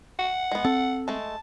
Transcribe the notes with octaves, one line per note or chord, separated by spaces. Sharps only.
F#5
G#3 B3
C4 A4
G#3 A3 A5